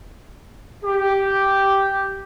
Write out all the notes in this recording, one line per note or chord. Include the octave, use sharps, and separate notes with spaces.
G4